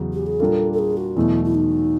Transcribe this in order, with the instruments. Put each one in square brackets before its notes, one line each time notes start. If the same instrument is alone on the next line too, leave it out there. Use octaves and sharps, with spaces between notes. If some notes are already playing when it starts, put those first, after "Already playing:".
Already playing: [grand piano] E2 C#3 F#3
[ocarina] G4
G#4
[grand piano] A#2 G3 A#3 D4 F4 [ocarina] A4
[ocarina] A4
G#4
F#4
[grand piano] E2 B2 F#3 A3 [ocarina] E4
[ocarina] E4
D#4